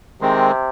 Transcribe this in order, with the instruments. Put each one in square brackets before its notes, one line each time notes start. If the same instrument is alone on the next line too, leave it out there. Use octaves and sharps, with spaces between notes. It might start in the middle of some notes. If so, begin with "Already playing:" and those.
[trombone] C3 [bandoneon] D#3 G#3 C4